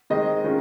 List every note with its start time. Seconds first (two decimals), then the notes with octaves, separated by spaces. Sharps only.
0.10 D#3 G#3 C4 D#5
0.44 D#3 G#3 C#4 F4